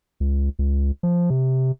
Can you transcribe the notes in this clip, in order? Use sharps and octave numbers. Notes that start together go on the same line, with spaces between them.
C#2
C#2
F3
C3